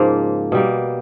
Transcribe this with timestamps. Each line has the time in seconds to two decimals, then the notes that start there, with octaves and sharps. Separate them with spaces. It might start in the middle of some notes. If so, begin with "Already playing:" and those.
Already playing: G#2 C#3 F3 A#3
0.52 B2 G3 A#3